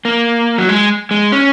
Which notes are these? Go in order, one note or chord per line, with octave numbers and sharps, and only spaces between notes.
A#3
F#3
G#3
G#3
C#4